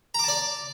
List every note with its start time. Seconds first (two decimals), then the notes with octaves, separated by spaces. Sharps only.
0.14 A#5
0.19 D6
0.24 A5
0.28 D5